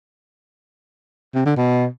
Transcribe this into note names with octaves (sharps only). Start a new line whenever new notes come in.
C3
D3
B2